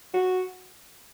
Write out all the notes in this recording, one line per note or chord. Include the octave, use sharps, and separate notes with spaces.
F#4